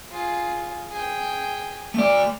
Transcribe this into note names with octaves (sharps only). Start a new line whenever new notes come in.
F4 G#4
G#4 G5
A3 D5 F7